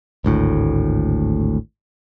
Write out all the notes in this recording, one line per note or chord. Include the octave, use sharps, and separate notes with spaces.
G#1 D2 A2